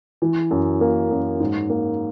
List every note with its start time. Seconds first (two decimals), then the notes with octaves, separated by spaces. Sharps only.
0.22 E3
0.51 F#2
0.81 A#3
1.11 F#2
1.40 G#2
1.70 A#3